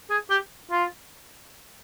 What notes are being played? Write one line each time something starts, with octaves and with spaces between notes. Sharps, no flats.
G#4
G4
F4